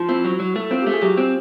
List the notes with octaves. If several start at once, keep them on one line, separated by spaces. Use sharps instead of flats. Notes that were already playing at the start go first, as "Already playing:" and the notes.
Already playing: F3
C4 E4
F#3
F#3
A3
C4 F4
A3 G4
G#4
F#3 G4
C4